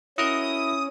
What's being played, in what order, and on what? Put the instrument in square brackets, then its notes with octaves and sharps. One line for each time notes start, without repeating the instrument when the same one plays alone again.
[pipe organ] C#4 [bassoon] E4 [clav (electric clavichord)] F#4 A#4 D#5 [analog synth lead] D#6